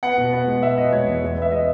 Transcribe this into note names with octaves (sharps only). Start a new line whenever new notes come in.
B3 F#5
B2
B3
G#3
B2 E5
B2 D#5
G#3 C#5
E2
G#3
B3 E5
G#3 D#5